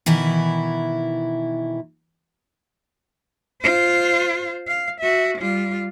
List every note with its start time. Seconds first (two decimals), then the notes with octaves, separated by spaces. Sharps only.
0.06 B2 D#3 E3 E4
3.62 F4 C5
4.67 F5
5.00 F#4 E5
5.38 G3 F4